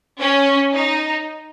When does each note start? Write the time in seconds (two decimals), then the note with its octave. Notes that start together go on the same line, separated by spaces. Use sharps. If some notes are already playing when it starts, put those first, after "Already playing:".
0.20 C#4
0.73 D#4